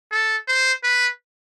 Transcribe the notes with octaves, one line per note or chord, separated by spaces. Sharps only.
A4
C5
B4